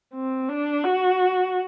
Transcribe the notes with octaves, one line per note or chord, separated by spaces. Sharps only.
C4
D4
F#4